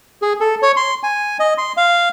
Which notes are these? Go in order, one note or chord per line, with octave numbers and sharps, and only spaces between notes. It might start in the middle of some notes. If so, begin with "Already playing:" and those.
G#4
A4
C#5
C6
G#5
D#5
C6
F5